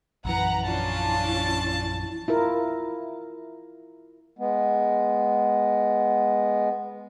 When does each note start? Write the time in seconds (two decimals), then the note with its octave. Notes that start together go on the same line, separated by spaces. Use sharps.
0.25 A#1 F#2 E3 B4 F#5 A#5
0.64 C#4 D4 E4 F4 A5
2.28 E4 F4 A#4
4.39 G#3 B3